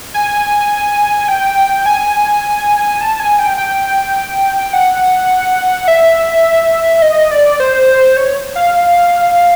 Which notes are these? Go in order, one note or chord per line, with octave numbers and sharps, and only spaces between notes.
G#5
G5
G#5
A5
G#5
G5
G5
F#5
E5
D#5
D5
C5
C#5
F5